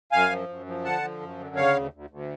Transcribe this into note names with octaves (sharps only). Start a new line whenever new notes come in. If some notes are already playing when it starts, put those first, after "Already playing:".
F#2 F5 G#5
F3
F#2
F3
D3 F#5 A5
F3
F#2
D3
C#3 C#5 F5
D2
D2
D2